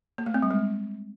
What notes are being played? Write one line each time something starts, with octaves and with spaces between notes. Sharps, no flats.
A#3
A3
C4
G3
G#3